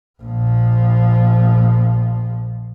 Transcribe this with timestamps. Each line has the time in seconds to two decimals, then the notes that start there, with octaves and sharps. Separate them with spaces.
0.21 A#1 F3